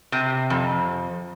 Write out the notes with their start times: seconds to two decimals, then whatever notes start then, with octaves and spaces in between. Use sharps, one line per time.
0.12 C3
0.50 F2